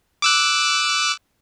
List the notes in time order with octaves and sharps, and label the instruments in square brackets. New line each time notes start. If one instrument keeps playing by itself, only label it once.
[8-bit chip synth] D6 E6 F#6